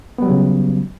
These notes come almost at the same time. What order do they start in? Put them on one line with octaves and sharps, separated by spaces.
B3 G3 F#3 C#3